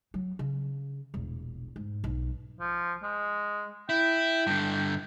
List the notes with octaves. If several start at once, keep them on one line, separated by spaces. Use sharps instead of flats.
F#3
C#3
E1 A#1
G#2
B1
F3
G#3
E4 G5
G2 D3